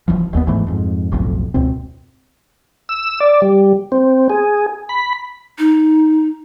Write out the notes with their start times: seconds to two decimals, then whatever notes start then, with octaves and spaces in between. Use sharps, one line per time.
0.08 F#1 F2 E3 F3
0.33 E1 D#2 C#3 B3
0.47 F#1 G#2 E3 A3
0.67 F2 G#2
1.12 F#1 B1 F2 A2
1.54 C#2 F#2 B2 C4
2.89 E6
3.20 D5
3.42 G3
3.92 C4
4.30 G#4
4.89 B5
5.58 D#4